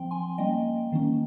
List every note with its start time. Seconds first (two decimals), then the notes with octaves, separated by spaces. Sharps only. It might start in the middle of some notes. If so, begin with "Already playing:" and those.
Already playing: F3 C4 G5
0.11 G#5 C6
0.38 G3 A#3 C#4 D#5 G5
0.92 D#3 A#3 C#4